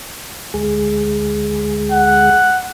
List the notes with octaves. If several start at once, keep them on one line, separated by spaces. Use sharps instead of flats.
D2 G#3 G#4
F#5